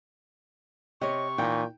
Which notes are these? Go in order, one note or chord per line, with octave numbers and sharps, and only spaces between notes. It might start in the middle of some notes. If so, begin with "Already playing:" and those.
C3 C#5 D#5 C#6
A#2 E3 D#4 G5